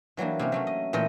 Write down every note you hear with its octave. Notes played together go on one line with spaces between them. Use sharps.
E3 F#3 G3 A#3 D4
C3 A#3 C#4
F#3 A3 C#4
D#5
A#2 E3 A3 A#4 D#5 G5